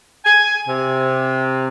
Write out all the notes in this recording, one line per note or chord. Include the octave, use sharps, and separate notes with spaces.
G#5
C3